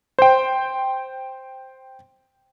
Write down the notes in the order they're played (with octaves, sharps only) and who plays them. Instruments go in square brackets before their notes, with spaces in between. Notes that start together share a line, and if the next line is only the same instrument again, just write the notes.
[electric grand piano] C5 G5